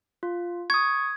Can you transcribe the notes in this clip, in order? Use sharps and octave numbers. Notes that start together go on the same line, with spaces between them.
F4
C#6 D#6 G#6